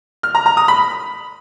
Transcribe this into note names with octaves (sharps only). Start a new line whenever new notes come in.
F6
A#5
A#5
D#6
B5